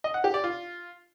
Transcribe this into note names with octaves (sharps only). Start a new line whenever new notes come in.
D#5
F#5
G4
D5
F4